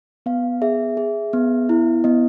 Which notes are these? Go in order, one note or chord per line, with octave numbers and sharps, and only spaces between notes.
B3 F5
G#4 E5
G#4
B3
E4
B3 D#5